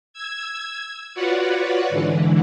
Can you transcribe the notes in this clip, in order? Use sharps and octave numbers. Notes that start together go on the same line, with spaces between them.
E6 G#6
F4 F#4 B4 C#5 D5 F#5
G#2 D3 E3